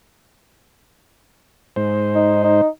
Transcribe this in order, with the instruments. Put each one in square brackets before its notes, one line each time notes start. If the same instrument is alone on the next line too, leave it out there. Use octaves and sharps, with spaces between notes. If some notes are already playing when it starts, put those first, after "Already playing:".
[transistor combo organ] G#2 C5
[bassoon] D#4
D#4